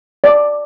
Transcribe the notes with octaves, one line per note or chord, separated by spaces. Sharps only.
D5